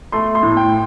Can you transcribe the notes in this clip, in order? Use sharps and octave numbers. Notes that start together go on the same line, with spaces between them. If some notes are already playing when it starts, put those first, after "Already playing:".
A3 C6
C6
A2
G5